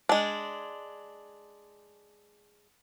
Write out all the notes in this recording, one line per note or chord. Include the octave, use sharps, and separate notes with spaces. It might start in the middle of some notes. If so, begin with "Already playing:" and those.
G#3 D4